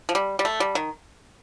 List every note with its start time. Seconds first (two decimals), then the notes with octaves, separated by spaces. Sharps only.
0.09 F3
0.15 G3
0.39 G3
0.45 A3
0.60 G3
0.75 D#3